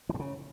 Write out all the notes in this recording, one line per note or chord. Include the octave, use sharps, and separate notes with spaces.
E3
G2
C#3